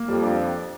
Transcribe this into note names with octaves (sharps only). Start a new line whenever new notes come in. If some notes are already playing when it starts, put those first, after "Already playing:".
Already playing: A#3
F2 G3
D4